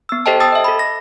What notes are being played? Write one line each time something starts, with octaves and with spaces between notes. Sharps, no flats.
B3 E6
G4 A4 C5 D#5 G5 A5
G5 A5 D#6 E6 A6
D#5 E5
A4 B5
A#6